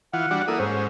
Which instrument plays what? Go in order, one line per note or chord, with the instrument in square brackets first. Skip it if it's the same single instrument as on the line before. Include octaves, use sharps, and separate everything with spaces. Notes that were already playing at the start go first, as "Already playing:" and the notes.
[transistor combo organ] E3 F4 [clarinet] F#5
[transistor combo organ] G3 D4 F#4
[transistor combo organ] A#3 E4 D#6 [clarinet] A4
[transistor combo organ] G#2 C#4 [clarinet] C5